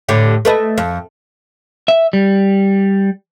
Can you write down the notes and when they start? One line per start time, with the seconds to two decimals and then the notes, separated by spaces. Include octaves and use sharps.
0.09 A2 D3 G4
0.45 A3 B4 D#5
0.78 F2
1.88 E5
2.13 G3